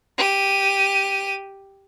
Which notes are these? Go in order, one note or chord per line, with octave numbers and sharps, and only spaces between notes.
G4 D#7